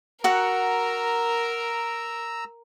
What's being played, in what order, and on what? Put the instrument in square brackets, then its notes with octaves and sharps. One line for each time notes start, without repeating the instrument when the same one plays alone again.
[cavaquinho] F#4 F#5 [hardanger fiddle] A#4 [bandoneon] A#5 E6